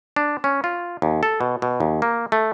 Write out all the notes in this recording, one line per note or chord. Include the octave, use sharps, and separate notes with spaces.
D4
C#4
F4
D#2
A4
B2
B2
D#2
A#3
A3